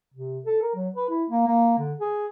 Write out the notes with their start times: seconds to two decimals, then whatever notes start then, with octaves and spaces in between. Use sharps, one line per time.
0.14 C3
0.46 A4
0.62 A#4
0.75 F#3
0.96 B4
1.09 E4
1.30 A#3
1.47 A#3
1.78 D3
2.00 G#4